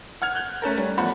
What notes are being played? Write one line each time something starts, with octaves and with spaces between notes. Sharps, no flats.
F#5 F6 G#6 F7
F#6 G6
A3 C#4 A4 A#4
G3
E2 F3 A3 F#5 B5